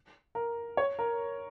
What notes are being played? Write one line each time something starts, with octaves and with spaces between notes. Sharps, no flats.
A#4
C#5
A#4